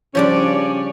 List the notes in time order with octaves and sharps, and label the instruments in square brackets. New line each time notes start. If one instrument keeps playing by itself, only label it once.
[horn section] C#3 C#4 [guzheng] F3 G3 D4 [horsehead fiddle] D5